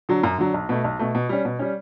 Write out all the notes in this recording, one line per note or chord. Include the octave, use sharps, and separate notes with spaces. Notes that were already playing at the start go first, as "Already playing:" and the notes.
D3 F#3
F#2
D3 F#3
B1
B2 A3
B1
B2 A3
B2
G3 C#4
B2
G3 C#4